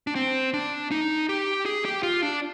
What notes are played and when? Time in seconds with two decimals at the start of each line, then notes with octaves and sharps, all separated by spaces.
0.07 D4
0.15 C4
0.54 D4
0.91 D#4
1.29 G4
1.66 G#4
1.85 G4
2.03 F4
2.22 D4